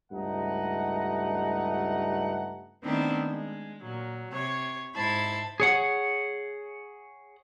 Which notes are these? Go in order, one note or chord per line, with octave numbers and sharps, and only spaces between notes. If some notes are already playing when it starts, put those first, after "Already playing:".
C#2 G2 A3 D#4 F#5 A#5
D#3 A3 B3 C4 D4 E4
G#3
A#2 F#3
C3 C#5 G#6
G#2 E4 C5 A5 B5 G#6
G#4 C#5 F#5